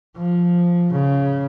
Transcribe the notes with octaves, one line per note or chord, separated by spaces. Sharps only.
F3
C#3